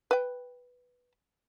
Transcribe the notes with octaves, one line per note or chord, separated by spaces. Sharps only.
B4 G5